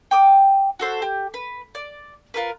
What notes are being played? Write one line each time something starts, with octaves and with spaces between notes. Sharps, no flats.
G5 D6 D#6
F#4 A4 C5
G4
B4
D5
F4 A#4 B4